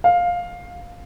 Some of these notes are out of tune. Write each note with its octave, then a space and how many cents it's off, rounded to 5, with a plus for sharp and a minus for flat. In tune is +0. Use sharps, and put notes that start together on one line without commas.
F5 +10